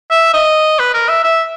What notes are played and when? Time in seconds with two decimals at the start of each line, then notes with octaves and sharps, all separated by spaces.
0.11 E5
0.34 D#5
0.79 B4
0.94 A#4
1.09 E5
1.24 E5